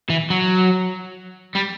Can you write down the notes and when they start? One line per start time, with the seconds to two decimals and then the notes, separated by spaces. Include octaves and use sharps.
0.10 E3
0.30 F#3
1.55 G3